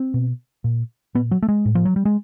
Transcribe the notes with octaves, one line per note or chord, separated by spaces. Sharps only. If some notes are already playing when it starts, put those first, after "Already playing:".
Already playing: C4
B2
A#2
A#2 B3
F#3
A3
G#3
A2
F3
F#3
G3
G#3